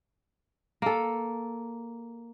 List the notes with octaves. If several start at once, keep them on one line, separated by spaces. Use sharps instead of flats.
A#3 A4